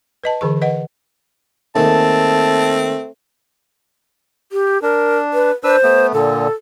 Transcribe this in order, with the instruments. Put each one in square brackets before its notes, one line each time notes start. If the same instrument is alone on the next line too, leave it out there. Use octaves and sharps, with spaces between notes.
[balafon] B4 D#5 A5
D3 E3 G#4 C#6
B4 D#5 F#5
[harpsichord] D#2 G#3 [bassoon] A3 [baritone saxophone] C4 [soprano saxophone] A5
[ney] G4
[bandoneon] D4 [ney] A#4
[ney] B4
[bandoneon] D4 B4 E6 [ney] C5
[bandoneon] A3 B3
[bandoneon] A#2 D3 [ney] A4